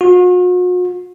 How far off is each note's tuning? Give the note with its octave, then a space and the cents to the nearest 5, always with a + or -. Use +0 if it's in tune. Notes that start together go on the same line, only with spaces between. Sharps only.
F#4 -45